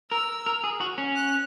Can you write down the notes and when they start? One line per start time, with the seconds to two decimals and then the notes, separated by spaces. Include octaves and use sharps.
0.11 A#4 E6
0.46 A#4
0.64 G#4
0.80 F#4
0.98 C#4
1.16 F#6